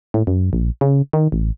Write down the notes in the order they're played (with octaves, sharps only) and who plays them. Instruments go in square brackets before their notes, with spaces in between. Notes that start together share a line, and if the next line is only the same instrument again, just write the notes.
[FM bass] A2
F#2
A#1
C#3
D#3
A1